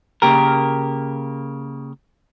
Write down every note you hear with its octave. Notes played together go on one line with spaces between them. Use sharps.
C#3 A#3 G4 A#4